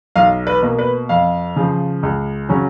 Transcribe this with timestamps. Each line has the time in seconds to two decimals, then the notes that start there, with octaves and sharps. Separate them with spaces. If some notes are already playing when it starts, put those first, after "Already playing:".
0.16 B1 F5
0.47 B4
0.63 B2 A#3
0.79 B4
1.09 F2 F5
1.56 C#3 F3
2.03 C#2
2.49 C#3 F#3 C#4